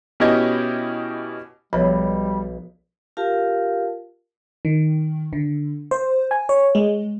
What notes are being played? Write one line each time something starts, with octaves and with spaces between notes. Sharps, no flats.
B2 C#4 E4 G4 D#5 G#6
B1 F3 G3 B3 C#5 B5
F4 G4 A#4 F5 A5
D#3
D3
C5
G#5
C#5
G#3